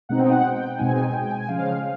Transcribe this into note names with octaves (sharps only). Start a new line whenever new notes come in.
B2 G#3 C4 D#4 F#5
G5
F#5
G5
B2 G#3 C4 D#4 G#5
G#5
G#5
G5
G#5
C#3 F3 G#3 F5